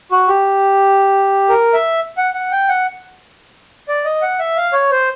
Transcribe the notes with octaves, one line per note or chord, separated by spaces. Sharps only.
F#4
G4
A#4
E5
F#5
F#5
G5
F#5
D5
D#5
F#5
E5
F5
C#5
C5